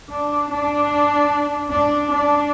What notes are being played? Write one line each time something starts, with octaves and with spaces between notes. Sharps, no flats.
D4
D4
D4
D4